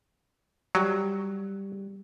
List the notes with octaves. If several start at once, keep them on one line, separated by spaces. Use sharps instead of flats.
F#3 G3